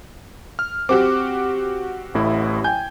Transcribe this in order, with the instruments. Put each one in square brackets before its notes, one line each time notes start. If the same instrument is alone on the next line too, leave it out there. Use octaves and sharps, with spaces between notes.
[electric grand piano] F6
[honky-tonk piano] C4 F#4 G4 [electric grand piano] D6
[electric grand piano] A1 A2 E4
[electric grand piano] G5 G#5 [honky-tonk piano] G6